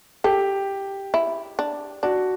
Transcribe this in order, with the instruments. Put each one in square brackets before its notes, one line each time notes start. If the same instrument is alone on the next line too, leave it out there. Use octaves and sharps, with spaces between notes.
[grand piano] G4 [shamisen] A4
[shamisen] E4
D4
[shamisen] D4 [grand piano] F#4